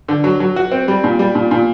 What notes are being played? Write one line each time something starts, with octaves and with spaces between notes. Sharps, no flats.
D3
F#3
F#3
F#4
C4
G3
A#2
G3
A#2
A#2